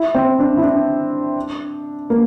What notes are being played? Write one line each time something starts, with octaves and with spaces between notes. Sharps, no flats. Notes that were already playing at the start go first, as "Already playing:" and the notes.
Already playing: E4
C4
D4
E4
D4
A#3